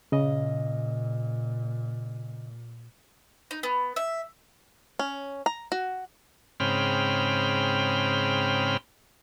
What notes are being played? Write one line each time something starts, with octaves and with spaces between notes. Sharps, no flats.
A#2 C#3 D#5
D#4
B3
E5
C#4
A#5
F#4
G#2 C#3 C4 G5 B5 F6